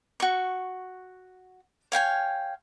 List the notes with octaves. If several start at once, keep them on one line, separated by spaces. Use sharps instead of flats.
F#4 C#6
C#5 F5 G5 G#5